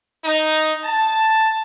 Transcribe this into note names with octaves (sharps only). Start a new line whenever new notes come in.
D#4
A5